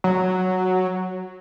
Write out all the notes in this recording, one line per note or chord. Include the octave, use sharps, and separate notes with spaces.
F#3